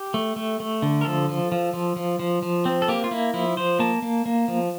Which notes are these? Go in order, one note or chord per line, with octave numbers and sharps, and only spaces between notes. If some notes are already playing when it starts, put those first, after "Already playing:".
Already playing: G4
A3
A3
A3
D3
A#4
F3 A4
F3
F3
F3
F3
F3
F3
C4
A4
A#3 G4
F4
A#3 E4
F3 E4
F3 C5
A#3 A5
A#3
A#3
F3